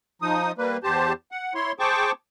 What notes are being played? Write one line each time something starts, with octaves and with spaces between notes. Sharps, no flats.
F3 D#4 D#6
G3 A#3 B4
E2 G4 C5 A5
F#5
E4 C#5 C6
G#4 C5 G5 A5 C#6 D6